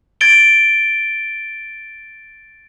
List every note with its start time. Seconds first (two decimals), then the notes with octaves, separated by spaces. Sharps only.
0.21 G#6 A6 D7 G7